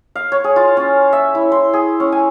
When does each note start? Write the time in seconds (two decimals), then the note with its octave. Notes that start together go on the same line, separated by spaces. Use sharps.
0.16 F5
0.32 C#5
0.44 G#4
0.56 F4
0.77 C#4
1.13 E5
1.35 E4
1.52 C6
1.73 G#4
2.00 C#4
2.12 G#5